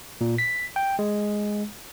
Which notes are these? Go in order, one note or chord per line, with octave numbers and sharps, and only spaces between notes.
A#2
B6
G5
G#3